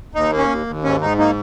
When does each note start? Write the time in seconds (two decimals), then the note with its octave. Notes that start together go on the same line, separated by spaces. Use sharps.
0.15 D#2 D#4
0.32 A#3
0.37 C#4
0.49 D#2
0.67 D#2
0.84 G#2 C#4
1.01 G#2 D#4
1.18 A#3 D#4